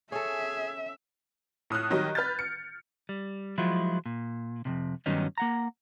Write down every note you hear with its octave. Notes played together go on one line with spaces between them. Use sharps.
C#4 G#4 A4 E5
A2 D#6 F6 F#6
D#3 F#3 G3 D#5
B4 F6 G6 A6
C#7
G3
F3 F#3 G#3 E4 F4
A#2
F2 A2 C3
G2 D#3 F#3 B3 C#4 D#4
A#3 F#5 A#5